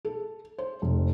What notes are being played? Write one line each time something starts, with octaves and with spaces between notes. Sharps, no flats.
A4
C5
F1